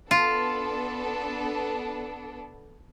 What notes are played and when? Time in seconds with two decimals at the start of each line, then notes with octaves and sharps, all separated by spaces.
0.11 B3 D4 F4 A4